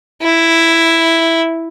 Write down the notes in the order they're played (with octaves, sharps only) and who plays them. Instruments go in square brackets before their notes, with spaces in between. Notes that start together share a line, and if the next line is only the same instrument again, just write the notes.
[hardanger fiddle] E4